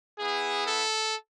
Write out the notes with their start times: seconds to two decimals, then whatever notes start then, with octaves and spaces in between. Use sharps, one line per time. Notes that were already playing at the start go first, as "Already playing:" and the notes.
0.19 B3 E4 G#4
0.67 A4